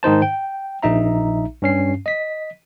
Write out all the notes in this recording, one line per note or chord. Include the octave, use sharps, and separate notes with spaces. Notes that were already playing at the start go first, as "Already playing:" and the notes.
G#2 D#3 D#4 C5 A5
G5
A#1 D#4 E5 A#5
G2 C#4 C7
D#5 B6